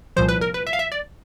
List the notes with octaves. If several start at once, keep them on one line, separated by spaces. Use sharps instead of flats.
C2 A#2 F3 C5
B4
A#4
B4
E5
F5
E5
D5